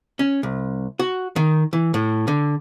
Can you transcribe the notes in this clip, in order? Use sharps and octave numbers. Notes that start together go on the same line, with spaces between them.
C#4
C2
F#4
D#3
E3
A2
D3